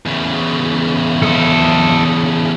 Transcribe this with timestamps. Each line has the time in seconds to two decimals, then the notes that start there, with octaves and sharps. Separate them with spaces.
0.06 E2 C#3
1.22 A4 D#5